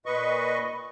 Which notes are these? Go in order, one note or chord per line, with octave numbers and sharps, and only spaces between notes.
A#2 B4 D#5 C#6